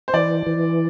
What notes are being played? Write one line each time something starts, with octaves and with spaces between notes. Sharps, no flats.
C5
E3 D5
E3